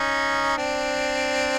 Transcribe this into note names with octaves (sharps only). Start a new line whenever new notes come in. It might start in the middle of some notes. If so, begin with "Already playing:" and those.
Already playing: C#4 D#4
C4 D4